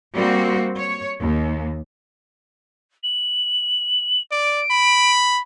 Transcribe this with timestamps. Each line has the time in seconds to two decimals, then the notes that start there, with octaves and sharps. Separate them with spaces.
0.14 G3 A#3 C4 F#4
0.78 C#5
1.21 D#2
3.03 F#7
4.31 D5 D7
4.70 B5